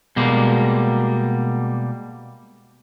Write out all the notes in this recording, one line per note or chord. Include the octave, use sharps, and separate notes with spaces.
B2 G3 G#3 A#3